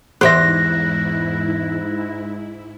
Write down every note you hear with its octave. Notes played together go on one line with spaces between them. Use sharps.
E2 G#2 E4 G4 C5 E5 F#6 A#6